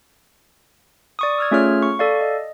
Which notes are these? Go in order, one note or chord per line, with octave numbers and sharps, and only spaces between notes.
D5 C#6 D#6
E6 F6 G#6
A3 C#4 F4 G#4 C#5 F6
C#6
A4 D5 F5
D#5